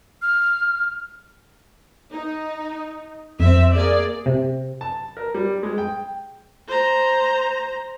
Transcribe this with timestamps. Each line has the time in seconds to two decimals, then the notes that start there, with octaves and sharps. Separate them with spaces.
0.22 F6
2.12 D#4
3.40 F2 C4 E5
3.74 A#3 G#4 D5
4.26 C3
4.81 A5
5.17 A#4
5.34 G3
5.63 G#3
5.78 G5
6.68 C5 A#5